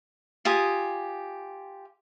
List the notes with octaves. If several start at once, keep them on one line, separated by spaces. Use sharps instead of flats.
F4 G4 G#5 D#6